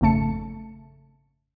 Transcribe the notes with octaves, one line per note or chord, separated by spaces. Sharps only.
G#1 F2 C#3 A3 A5 C#7